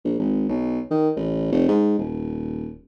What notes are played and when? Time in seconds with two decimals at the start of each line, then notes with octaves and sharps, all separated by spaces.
0.05 A#1
0.19 G#1
0.49 B1
0.91 D#3
1.16 A1
1.52 F1
1.68 G#2
1.99 D#1